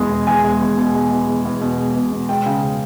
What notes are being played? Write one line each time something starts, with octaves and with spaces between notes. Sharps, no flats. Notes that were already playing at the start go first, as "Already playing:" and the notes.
Already playing: E2 B2 G#3
E2
E2 G#5
G#3
E2
B2
G#3
E2
E2
E2
B2
G#3
B2
B2
G#3 G5
C#3
C#3